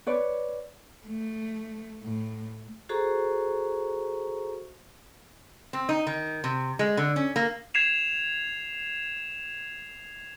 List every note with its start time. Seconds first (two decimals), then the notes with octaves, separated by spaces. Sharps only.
0.07 B4 C#5 D5
1.07 A3
2.04 A2
2.89 F#4 G#4 A4 C5 A#5 C#6
5.73 C4
5.89 D#4
6.07 D#3
6.44 C3
6.79 G#3
6.97 D3
7.16 C#4
7.36 A#3
7.74 G#6 C7 E7 F7